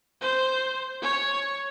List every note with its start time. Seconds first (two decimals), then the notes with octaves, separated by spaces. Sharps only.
0.21 C5
1.02 C#5